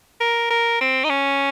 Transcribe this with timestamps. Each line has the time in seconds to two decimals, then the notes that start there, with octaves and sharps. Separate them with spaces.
0.20 A#4
0.50 A#4
0.80 C4
1.04 D#4
1.09 C#4